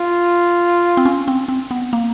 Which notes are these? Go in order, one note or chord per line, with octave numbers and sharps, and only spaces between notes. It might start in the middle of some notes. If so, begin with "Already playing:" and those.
Already playing: F4
C4
C#4
C4
C4
B3
A#3